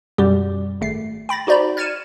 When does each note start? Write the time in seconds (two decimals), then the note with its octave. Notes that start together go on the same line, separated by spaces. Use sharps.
0.18 F#2 B2 G3 G4
0.81 G#1 A3 C7
1.29 G5 B5 A6 A#6
1.47 D#4 F#4 C5 D5 A#5 B5
1.77 F6 G#6 A6 C#7 D#7 E7